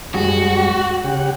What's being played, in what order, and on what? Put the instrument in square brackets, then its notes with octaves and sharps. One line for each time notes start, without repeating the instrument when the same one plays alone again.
[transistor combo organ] F#2 G3 G#3 [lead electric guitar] F#4
[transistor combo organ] C#3 G4 F#5